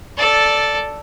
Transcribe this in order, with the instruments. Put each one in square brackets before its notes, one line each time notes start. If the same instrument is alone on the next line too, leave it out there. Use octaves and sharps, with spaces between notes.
[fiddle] A4 D5